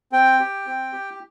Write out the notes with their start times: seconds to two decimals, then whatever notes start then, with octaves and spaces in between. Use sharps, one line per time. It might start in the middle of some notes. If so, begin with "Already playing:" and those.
0.12 C4 G5
0.40 G4
0.66 C4
0.93 G4